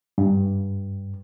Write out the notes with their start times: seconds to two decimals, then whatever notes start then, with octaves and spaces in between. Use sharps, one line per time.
0.18 G2